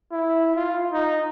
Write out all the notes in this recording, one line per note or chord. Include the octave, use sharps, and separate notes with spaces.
E4
F4
D#4